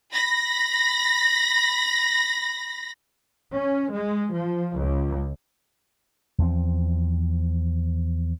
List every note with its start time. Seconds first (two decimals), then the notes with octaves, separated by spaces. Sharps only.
0.12 B5 A#6
3.53 C#4
3.94 G#3
4.33 F3
4.79 C#2
6.38 E2 F3 C4